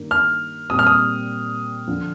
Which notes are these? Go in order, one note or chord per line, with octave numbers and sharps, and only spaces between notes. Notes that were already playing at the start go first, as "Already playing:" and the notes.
Already playing: G2 D#3 A#3
F6
A#2 G3 C4 D#6
F6
D#6
D3 F3